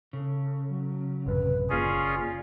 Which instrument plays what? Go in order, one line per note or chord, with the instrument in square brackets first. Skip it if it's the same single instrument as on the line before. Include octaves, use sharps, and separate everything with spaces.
[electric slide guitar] C#3 [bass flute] A4
[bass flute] F#3
[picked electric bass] A1 F#2 C3 [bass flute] B4
[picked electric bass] F#1 C#3 A#3 [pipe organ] C#4 F4 G#4 [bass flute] D5